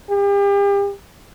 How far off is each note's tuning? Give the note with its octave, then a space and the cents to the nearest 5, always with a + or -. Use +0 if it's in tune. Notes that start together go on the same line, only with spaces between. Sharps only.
G4 +40